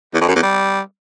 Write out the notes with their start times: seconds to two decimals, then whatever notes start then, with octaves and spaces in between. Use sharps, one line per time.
0.14 E2
0.21 F2
0.28 F#2
0.35 E2
0.43 G3